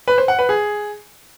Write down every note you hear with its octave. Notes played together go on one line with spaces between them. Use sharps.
B4
C5
F#5
B4
G#4